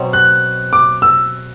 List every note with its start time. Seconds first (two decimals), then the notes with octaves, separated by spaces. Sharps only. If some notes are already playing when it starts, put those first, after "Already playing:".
Already playing: B2 F#3 C4
0.13 F#6
0.73 D6
1.02 E6